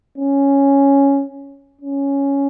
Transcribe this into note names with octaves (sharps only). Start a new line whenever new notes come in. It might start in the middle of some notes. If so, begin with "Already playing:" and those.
C#4
C#4